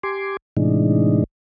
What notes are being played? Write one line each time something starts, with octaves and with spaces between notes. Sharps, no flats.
G4 G#5 C6 D6
A2 C3 E3 G#3 D4 D#4